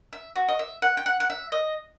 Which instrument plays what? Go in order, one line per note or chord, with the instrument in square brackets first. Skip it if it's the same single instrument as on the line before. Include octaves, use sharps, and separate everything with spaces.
[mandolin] E5
F#4
D#5
E5
F#5
G5
F#5
F#5
E5
D#5